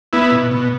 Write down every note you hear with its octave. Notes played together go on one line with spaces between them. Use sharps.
B3 E4
B2
B2